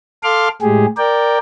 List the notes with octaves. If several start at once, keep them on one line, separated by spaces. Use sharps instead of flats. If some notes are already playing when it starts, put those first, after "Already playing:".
A4 F5 C6 D6 F6
A2 G#3 G4 G#4
A#4 D5 G5